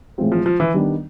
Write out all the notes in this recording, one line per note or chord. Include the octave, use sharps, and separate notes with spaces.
A2 E3 G#3 C4 F4
F3
F3
E3
D#3 G3 B3 D4